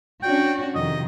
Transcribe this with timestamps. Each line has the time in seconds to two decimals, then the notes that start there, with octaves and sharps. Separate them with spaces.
0.22 C#4 D4 F#4 G5
0.75 F2 C3 D#3 D#5